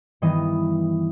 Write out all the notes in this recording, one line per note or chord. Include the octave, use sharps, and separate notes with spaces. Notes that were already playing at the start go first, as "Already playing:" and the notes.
G2 D#3 E3 B3 D#5